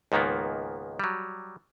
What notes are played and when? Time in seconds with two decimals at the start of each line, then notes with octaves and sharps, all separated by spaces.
0.12 C#2 G#2 D#3 A#3 B3
1.00 F#3 G3